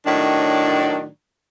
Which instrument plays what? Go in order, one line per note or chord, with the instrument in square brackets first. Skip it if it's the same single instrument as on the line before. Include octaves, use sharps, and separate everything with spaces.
[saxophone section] A2 D#3 F#3 D4